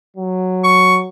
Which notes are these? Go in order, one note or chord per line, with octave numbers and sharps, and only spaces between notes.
F#3
C#6